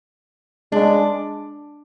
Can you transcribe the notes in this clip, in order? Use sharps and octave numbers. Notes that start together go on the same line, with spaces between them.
G#3 D4